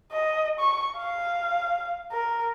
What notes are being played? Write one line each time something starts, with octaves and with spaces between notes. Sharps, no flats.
D#5
C#6
F5
A#4